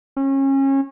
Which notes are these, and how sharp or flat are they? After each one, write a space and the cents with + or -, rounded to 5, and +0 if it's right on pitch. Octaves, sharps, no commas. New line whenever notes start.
C#4 -30